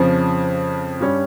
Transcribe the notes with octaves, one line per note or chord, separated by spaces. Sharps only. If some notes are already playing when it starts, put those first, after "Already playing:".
Already playing: F2 C#3 F3
G2 G3 C#4